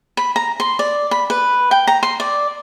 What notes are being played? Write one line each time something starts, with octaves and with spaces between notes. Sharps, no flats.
B5
A#5
C6
D5
B5
B4
G5
A#5
C6
D5